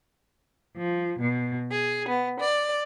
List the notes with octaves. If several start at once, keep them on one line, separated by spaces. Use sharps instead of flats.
F3
B2
G#4
B3
D5